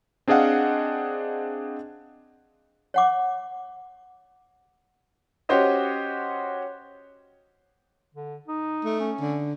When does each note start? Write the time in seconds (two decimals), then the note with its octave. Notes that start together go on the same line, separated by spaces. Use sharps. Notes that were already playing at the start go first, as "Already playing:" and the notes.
0.28 C4 D4 G#4 D#5 F5 F#5
2.94 C#5 F#5 D6
5.49 C#4 F#4 G4 C5 C#5 D#5
8.15 D3
8.48 D#4
8.85 A3
9.00 C#4
9.21 D3